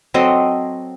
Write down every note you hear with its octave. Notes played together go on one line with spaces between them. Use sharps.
F#3 C4 A4 D#5